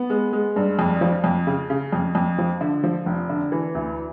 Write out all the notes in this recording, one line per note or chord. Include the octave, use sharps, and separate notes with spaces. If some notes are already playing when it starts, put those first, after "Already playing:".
Already playing: B3
G#3
G#3
G2
F2
F3
F2
C#3
C#3
F2
F2
F3
D3
F3
F1
D3
E3
D2